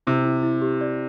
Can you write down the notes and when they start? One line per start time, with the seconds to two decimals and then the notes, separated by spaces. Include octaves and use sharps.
0.07 C3 E4
0.25 E4
0.43 E4
0.62 G4
0.81 D5